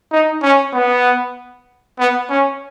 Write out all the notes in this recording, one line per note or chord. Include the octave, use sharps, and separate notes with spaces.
D#4
C#4
B3
B3
C#4